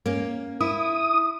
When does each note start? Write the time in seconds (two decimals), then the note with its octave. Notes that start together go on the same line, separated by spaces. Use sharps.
0.06 A#3 C#4
0.61 E4 D#6